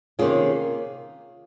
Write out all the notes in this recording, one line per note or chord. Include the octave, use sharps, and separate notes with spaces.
C3 D#3 A#3 C#4 F4 G#4